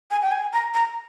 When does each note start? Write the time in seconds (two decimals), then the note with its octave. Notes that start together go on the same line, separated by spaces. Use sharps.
0.11 G#5
0.22 G5
0.32 G#5
0.53 A#5
0.74 A#5